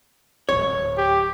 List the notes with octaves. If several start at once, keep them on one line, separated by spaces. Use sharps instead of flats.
D1 G#1 C#5
G4